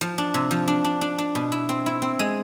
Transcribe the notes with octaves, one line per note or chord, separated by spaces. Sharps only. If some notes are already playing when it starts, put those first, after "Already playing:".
F3
D4
C3
F3
D4
D4
D4
D4
B2
E4
C4
E4
C4
G#3